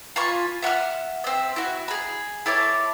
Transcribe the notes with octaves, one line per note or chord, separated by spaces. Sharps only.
F4 G#5 B5 C#6
E5 F#5 B5 F6
C4 E5
E4 F#4
G#4 B5
E4 A4 C#5 D5